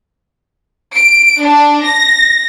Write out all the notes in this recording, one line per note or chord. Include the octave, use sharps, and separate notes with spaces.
D7
D4
A#6